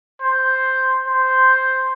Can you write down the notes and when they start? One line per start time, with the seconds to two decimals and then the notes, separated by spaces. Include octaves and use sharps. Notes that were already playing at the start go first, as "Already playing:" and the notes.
0.22 C5
1.07 C5